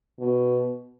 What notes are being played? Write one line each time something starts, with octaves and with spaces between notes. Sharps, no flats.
B2